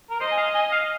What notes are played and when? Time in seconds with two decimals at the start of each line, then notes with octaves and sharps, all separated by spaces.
0.10 A#4
0.20 C5 D#5
0.31 G#5
0.37 F5
0.55 G#5
0.72 F5